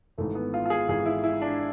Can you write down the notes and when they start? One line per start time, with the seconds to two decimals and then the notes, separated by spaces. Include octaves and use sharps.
0.18 G#1 G#2 E3 A3
0.35 B3
0.54 F4
0.66 F4
0.70 G#4
0.88 G#1 G#2 E3 G#4
1.06 E4
1.24 E4
1.42 D4